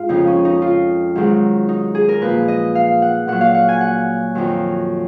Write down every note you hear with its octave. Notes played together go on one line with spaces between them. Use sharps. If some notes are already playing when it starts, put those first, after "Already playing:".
Already playing: G#2 F4
F2 C#3 F3 D#4
C#4
D#4
F4
G#2 D#3 F#3
D#4
G#4
A#4
A#2 F3 B4
D#5
F5
F#5
A#2 F#3 F#5
F5
F#5
G#5
F#5
F2 D#3 F#3